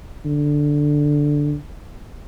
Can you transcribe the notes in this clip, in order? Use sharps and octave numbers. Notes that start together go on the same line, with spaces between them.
D3